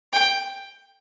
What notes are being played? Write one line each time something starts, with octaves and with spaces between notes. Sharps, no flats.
G5